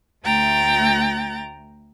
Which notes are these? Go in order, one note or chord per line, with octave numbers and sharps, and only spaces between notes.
D2 A3 G5 A#5 A6